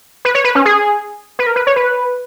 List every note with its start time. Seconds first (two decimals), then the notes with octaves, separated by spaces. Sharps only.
0.25 B4
0.35 C#5
0.44 B4
0.55 C#4
0.65 G#4
1.39 B4
1.46 A#4
1.56 B4
1.67 C#5
1.76 B4